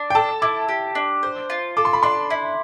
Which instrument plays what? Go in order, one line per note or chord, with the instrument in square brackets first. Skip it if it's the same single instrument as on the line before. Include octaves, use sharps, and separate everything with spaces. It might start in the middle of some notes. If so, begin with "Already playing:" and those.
Already playing: [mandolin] D4
[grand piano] G5
[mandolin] A4 [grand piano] A5
[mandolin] E4 [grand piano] D6
[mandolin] G4
D4
C5
F4
[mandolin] A4 [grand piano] D6
[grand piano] C6
B5
[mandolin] D4 [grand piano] C6
[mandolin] E4